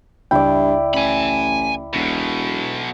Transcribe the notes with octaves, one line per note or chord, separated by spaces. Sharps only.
C#2 G2 E4 D5 G5
A1 G#5 B5
E1 B1 B2